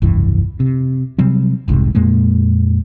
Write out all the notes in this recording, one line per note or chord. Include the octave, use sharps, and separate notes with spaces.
F1 C#2 G2 E3
C3
C3 F#3 G3 C4
F1 C2 G#2 C3
F2 A#2 G#3 A#3